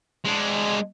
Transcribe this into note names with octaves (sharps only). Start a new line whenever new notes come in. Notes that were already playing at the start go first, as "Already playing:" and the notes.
G#3 D4